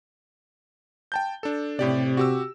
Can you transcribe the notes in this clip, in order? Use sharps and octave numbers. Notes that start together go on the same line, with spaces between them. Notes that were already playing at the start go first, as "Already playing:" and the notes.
G5 A5 G6
D4 A4
A2 C3 G4 D5
F#4 G4 E6